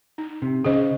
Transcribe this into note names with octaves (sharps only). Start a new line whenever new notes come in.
D#4
C3
C#3 G#4 C5 D#5